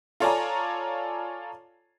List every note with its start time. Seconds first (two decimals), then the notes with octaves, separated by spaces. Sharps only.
0.20 F4 A4 C#5 D5 G#5 A#5